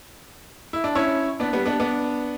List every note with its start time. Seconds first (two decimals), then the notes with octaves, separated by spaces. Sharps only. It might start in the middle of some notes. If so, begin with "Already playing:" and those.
0.73 E4
0.84 D4
0.95 C#4 E4
1.40 B3 D4
1.53 G3 B3
1.66 B3 D4
1.80 B3 D4